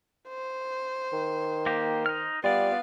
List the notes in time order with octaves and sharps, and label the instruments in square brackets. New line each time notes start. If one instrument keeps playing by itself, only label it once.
[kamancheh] C5
[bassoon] D#3
[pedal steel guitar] A#3 G4
D#4 F6
[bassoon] G3 [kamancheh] B3 F5 [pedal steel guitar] F4 D5